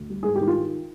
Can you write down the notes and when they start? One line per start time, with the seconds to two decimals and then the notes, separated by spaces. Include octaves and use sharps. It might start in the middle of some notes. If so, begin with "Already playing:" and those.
Already playing: D2
0.10 G3
0.23 G#2 G#4
0.36 G4
0.41 D#3
0.48 F4